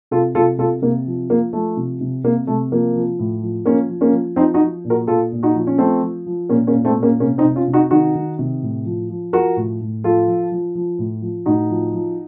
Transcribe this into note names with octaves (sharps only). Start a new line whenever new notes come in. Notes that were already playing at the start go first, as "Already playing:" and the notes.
C3 F4 A4
C3 F4 A4
C3 F4 A4
C3 A#3
F3
F3 A#3
F3 A3
C3
C3
C3 A#3
C3 A3
F3 A#3
F3
A2
F3
F3 A#3 C#4
F3
A#3 C#4
F3
F3 C4 D#4
D#4 F#4
F3
A#2
F#4 A#4
A#2 F4 A4
A#2
D#4 F#4
F3
C#4
F3 A3 C4
F3
F3
A#2 A#3 C#4
A#3 C#4
A#2
A3 C4
A#2
A#3 C#4
C3 A#3 C#4
C4 D#4
C3
C#4 F4
C3
D#4 F#4
D#3 D#4 F#4
D#3
C3
A2
F3
F3
F3 F#4 A#4
A2
A2
F3 F4 A4
F3
F3
F3
A2
F3
A2 D#4 F#4
F3
F3